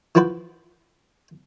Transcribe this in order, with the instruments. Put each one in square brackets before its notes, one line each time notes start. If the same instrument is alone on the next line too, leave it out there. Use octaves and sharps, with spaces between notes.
[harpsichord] E3 F3 F#4 B4 C5